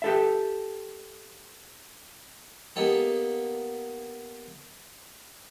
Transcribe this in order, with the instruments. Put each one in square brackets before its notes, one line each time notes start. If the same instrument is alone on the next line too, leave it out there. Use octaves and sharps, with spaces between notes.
[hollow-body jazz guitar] G4 A4 E5
[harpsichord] A#3 B3 D#4 G4 A4